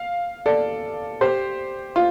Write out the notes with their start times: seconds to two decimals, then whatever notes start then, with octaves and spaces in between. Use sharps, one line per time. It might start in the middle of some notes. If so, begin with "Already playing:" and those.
Already playing: F5
0.46 A4 D5
1.21 G4 C5
1.96 F4